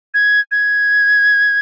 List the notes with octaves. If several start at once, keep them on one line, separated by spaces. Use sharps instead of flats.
G#6
G#6